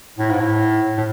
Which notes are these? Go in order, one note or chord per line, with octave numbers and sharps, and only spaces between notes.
A2
G#2
A2
A2